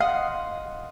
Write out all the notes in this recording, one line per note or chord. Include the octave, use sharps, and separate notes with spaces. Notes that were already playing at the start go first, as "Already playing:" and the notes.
D#5 F5 F#5 C6